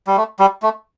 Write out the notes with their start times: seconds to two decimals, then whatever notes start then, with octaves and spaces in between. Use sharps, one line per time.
0.07 G3
0.17 A3
0.39 G3
0.63 A3